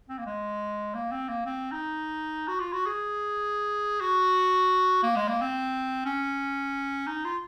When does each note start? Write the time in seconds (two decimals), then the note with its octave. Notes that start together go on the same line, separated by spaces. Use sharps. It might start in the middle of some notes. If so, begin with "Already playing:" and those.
0.09 C4
0.19 A#3
0.26 G#3
0.95 A#3
1.12 C4
1.29 A#3
1.46 C4
1.72 D#4
2.48 F#4
2.60 F4
2.73 F#4
2.86 G#4
4.01 F#4
5.03 A#3
5.16 G#3
5.29 A#3
5.41 C4
6.06 C#4
7.07 D#4
7.25 F4